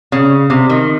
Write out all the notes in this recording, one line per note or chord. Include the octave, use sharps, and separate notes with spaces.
C#3
C3
D#3